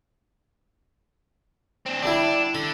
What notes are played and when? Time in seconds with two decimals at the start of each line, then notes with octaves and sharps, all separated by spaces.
1.86 C4 D4
2.03 D3 G3 D4 E4
2.55 D3 B5